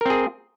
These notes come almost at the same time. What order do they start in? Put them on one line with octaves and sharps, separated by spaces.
A#4 C4 G#4